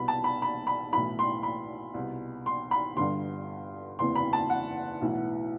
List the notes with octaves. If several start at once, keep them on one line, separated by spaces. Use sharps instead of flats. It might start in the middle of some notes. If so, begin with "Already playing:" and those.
Already playing: C2 B2 B5
A5
B5
B5
B5
B1 A2 E3 B5
C6
B5
C2 B2
C6
B5
G1 G2 D3 C6
F#1 E2 C3 E3 C6
B5
A5
F#5
B1 A2 E3